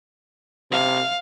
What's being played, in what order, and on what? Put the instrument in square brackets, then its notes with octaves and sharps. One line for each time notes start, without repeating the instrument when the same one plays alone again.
[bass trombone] C3 [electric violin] F5